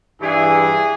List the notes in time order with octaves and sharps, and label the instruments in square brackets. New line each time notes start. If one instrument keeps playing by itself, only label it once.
[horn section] G2 E3 G#4